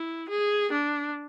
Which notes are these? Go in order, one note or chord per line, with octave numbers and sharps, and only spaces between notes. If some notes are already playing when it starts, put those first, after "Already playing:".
Already playing: E4
G#4
D4